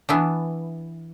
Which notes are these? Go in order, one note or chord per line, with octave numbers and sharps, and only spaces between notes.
E3 B3 D4